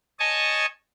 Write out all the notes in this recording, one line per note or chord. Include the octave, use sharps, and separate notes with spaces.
C#5 D#5 G#5 A5 C#6 D#6